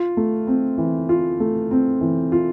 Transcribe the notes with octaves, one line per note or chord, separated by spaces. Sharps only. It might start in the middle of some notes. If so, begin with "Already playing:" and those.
Already playing: F4
A3
C4
E3
F4
A3
C4
E3
F4